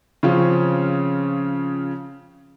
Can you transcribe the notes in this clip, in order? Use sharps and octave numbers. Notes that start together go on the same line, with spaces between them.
C#3 F3 C4 C#4 F4